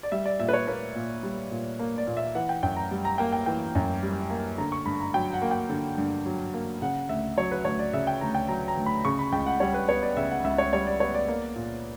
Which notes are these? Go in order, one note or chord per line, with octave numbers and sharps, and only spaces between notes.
D5
G3 E5
D5
A#2 E5
B4
C#5
A#3 B4
A#2
G3
A#2
A#3
D5
A#2
E5
E3 F#5
G5
F#2 G5
A#5
G3
A#5
A#3 G5
G5
E3 G5
F#2
G3
A#3
D3 A#5
C#6
G2 B5
A#5
F#3 G5
F#5
A#3
G5
D3
G2
F#3
A#3
C#3 F#5
D2 E5
F#3 C#5
B4
D2 C#5
D5
C#3 E5
G5
D2 A#5
G5
F#3 A#5
A#5
D2
B5
C#3 C#6
B5
C#2 G5
F#5
G3 C#5
B4
B3 C#5
D5
C#3 E5
F#5
C#2 E5
C#5
G3 C#5
D5
B3 C#5
D5
A#3
A#2